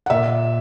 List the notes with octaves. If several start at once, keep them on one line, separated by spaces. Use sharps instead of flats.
F#5
A#2 E5